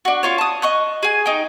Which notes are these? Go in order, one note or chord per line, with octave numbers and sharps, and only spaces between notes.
D4 F#4
C#4 F4 C#5
A5 D#6
D#5 C#6 F#6
G#4 G#5
D#4 G5